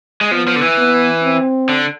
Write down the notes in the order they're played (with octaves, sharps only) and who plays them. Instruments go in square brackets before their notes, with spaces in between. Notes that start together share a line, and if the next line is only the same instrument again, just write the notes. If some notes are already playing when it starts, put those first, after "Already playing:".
[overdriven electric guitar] G#3
[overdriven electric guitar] F3 [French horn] B3
[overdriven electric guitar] F3
D3
E3
[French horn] B3
C4
[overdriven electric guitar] D3